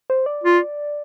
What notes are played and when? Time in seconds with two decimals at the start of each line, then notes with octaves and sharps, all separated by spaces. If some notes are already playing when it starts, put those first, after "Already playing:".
0.10 C5
0.26 D5
0.44 F4